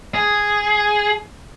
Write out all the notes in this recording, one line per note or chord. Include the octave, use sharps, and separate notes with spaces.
G#4